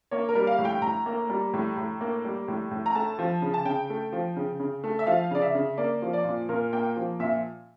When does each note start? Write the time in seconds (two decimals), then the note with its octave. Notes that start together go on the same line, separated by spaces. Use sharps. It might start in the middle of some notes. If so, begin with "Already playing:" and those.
0.11 A#3 C#5
0.29 A#4
0.35 G3
0.47 F5
0.59 A2
0.65 G5
0.82 A2 A#5
1.06 A#3
1.30 G3
1.54 A2
1.77 A2
2.01 A#3
2.24 G3
2.48 A2
2.71 A2
2.86 A#5
2.95 A3 A5
3.19 F3
3.42 C#3
3.54 A5
3.65 C#3 G5
3.90 A3
4.12 F3
4.36 C#3
4.60 C#3
4.84 A3
4.99 E5
5.07 F3 F5
5.31 C#3 D5
5.42 E5
5.55 C#3
5.77 A#3 D5
6.02 F3
6.13 D5
6.25 A#2
6.49 A#2 A#4
6.73 A#3 G5
6.96 F3
7.20 A#2 E5